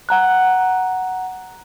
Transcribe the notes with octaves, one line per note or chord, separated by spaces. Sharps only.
F#5 A#5 F#6